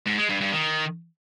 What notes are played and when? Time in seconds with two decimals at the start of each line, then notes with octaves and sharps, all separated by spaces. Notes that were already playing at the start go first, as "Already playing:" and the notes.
0.06 G#2
0.18 G#3
0.29 G2
0.41 G2
0.52 D#3